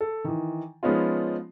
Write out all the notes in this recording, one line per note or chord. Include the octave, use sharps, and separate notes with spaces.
A4
D#3 E3
F3 G#3 B3 C#4 D#4 F4